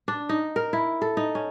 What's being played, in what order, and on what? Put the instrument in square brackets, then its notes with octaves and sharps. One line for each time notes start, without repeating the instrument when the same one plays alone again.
[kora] D4
D#4
A#4
E4
A4
D#4
C#4